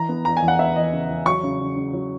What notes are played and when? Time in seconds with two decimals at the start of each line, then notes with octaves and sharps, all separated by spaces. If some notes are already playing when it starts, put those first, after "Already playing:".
Already playing: E3 A#5
0.09 B3
0.25 E2 A#5
0.37 G#5
0.42 E2
0.48 F#5
0.59 B3 E5
0.75 E3 D#5
0.92 C#3
1.09 E2
1.26 F#3 C#6
1.43 C#3
1.60 C#3
1.76 C#3
1.93 F#3